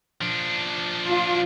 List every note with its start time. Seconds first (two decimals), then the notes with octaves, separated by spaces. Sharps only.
0.21 F3 D4
1.08 F4